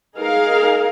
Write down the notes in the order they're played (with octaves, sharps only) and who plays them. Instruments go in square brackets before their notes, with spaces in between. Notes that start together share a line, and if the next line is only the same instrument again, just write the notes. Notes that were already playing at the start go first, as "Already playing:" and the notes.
[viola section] D#4 G#4 A#4 F5